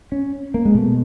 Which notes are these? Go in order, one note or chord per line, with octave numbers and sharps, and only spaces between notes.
C#4
A#3
G#3
B2 A3